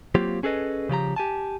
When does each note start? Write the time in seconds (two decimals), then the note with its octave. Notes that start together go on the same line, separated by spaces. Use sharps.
0.15 F#3 A#3 C4 F4 G4
0.43 C#4 G#4 A4 B4 D#5
0.89 C#3 F3 G4 A#5
1.16 G4 G#5 A5